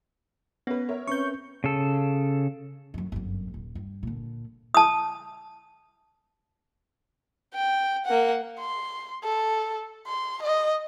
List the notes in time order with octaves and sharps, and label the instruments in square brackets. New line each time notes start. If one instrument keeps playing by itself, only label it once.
[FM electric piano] B3 [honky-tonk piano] C#4 B4
[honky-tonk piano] A#4 C#5 E5
[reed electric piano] C4 C#4 B4 [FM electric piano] C#6 G6
[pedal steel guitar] C#3 A4
[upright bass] F#2 F#3
G1 F#2
D#1
G2
A#2 D3
[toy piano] A5 D#6
[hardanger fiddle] G5
A#3 F#5
[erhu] C6
A4
C6
D#5